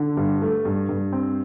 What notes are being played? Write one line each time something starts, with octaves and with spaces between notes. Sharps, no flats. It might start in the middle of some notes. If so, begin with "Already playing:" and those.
Already playing: D3
G2
A3
G2
G2
C4